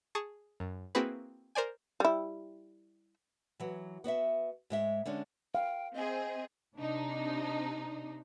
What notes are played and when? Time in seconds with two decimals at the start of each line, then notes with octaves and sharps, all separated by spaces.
0.15 G#4 A5 C#6 D#6
0.60 F#2
0.95 A#3 C4 E4 F#4 G#4 B4
1.55 A#4 C5 D5 G#5
2.00 G3 E4
3.60 E3 F#3
4.04 B3 F#4 D5 E5
4.70 G#2 G#3 E5
5.05 D3 G#3 C#4 D4
5.55 F5 G5
5.94 C4 G#4 D#5
6.76 C3 D4 D#4